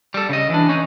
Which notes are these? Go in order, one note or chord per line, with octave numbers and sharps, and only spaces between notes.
G3 A4
C#3 D#5
E3 D4
C#4 D#4